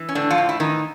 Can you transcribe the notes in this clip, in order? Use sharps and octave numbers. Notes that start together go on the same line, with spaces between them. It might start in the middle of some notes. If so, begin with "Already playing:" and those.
Already playing: E3
C#4
A2 D3 D4
F3 F4
A2
E4
D#3 E3 D#4